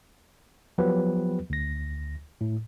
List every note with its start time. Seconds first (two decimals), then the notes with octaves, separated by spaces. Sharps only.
0.78 F3 F#3 B3 G4 B4
1.50 D2 A#6
2.41 A2